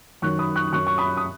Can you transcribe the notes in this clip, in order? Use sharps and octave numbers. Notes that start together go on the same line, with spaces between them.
F#2 D#3 F#3 C#6 F#6
B5 D#6
C#6 F#6
F#2 F#3 C#6 F#6
C#6
B5 D#6
D#6